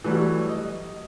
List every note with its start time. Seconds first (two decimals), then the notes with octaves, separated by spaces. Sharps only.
0.04 E3 F#3 G3 A3
0.49 D#5